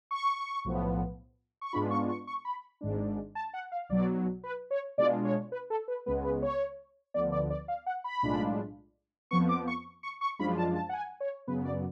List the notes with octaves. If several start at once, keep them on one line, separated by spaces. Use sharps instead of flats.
C#6
B1 A2 F3 B3
C#6
G#2 G#3 B3 D4 F4 B5
C#6
C#6
C#6
B5
G#1 G#2 G#3 D4
A5
F#5
F5
B1 B2 F#3 D5
B4
C#5
B2 G#3 D4 F4 D5
C#5
B4
A4
B4
C#2 C#3 G#3 B3 B4
B4
C#5
D2 D3 F3 B3 D5
D5
D5
F5
F#5
B5
B1 A2 G#3 D4 F4
F2 F3 B3 C#6
D6
C#6
C#6
C#6
F#2 F3 G#3 D4 F4 B5
A5
A5
F#5
G#5
C#5
F#2 C#3 F#3 B3 B4
D5